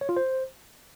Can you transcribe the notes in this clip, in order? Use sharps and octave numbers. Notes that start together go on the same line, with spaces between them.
C#5
F4
C5